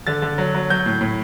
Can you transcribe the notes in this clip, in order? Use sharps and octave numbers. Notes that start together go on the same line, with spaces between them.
D3 A6
D3
F#3
F#3
F#3 G6
A2
A2